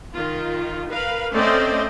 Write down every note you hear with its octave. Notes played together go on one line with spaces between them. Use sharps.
D#3 F4
A#4 B4 F5
A3 C4 C#4 C5 D5 D#5